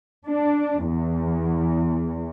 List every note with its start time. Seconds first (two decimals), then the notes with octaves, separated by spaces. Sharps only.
0.28 D4
0.87 E2